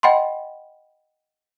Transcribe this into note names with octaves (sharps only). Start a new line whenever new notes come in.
D#5 F#5 G5 B5 C6